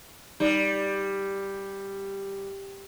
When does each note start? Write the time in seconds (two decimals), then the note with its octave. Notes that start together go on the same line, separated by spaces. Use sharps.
0.40 G3 D#4 D5